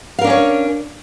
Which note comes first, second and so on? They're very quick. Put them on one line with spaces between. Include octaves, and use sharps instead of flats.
F5 A#4 D4 C#4 C#5